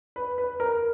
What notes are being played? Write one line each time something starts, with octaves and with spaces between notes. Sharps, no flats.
B4
B4
A#4